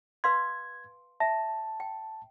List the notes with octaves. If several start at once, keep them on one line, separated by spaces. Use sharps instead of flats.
B4 F5 C6 G#6
E5 A5
G5